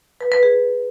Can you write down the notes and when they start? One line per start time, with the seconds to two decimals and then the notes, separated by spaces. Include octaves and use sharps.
0.21 B4
0.32 B4
0.43 G#4